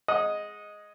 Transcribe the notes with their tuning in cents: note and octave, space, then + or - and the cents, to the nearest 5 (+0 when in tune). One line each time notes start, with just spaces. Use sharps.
G#3 +5 D#5 +0 F#5 -30